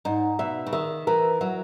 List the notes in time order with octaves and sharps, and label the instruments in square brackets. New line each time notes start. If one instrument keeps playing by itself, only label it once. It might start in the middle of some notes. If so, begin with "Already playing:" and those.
[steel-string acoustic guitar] G#2 [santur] D#4
[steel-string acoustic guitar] B2 [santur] E5
[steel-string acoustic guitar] C#3
[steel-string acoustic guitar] D#3 [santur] E5
[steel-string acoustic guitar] E3 [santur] A#4
[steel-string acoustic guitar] F#3 [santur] E5